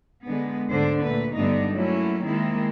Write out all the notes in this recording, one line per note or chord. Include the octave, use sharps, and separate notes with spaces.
D3 G#3 B3
D2 G#2 D3 D4 C5
A#2 A3 B4
G2 D3 A3 B3 D4 D#4
F#3 A3 A#3 C#4 E4
D#3 G#3 A#3 C4 E4